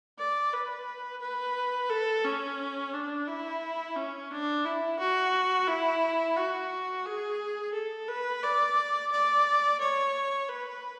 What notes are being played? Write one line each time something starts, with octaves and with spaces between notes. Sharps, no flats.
D5
B4
B4
A4
C#4
D4
E4
C#4
D4
E4
F#4
E4
F#4
G#4
A4
B4
D5
D5
C#5
B4